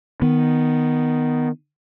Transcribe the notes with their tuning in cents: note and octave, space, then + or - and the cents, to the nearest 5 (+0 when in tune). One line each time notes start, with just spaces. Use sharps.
D#3 +0 B3 +5